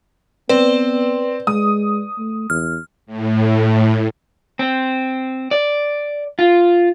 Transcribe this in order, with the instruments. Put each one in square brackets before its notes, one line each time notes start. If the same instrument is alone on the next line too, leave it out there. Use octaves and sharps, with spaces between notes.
[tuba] B3 [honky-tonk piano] C4 [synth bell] B4 D5
[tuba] G#3 [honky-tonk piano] D#6
[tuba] A3
[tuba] E2 [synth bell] F6
[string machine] A2
[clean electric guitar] C4
D5
F4